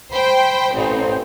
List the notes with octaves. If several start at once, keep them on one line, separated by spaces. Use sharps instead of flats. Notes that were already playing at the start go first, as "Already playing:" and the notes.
C5 G5 B5
A1 C4 C5